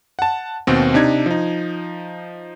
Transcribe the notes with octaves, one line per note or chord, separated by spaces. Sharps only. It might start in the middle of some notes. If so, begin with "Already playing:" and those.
F#5 A5
D#2 B2 C4
C3 D4 D#4 G#6
F3 D#4